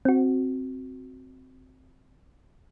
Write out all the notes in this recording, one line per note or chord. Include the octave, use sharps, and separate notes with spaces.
C4 F#4